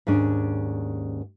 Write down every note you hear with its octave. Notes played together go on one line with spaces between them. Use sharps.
D#2 G#2 C#4 D4